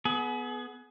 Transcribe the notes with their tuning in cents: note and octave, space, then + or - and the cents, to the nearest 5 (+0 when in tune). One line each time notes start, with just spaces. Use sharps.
B3 +0 G#4 +40